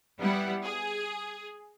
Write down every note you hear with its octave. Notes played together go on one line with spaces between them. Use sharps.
G3 B3 E4 F#5
G#4